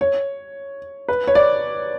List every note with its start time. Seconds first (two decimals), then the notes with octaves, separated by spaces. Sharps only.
0.01 C#5
1.08 B4
1.27 C#5
1.35 D5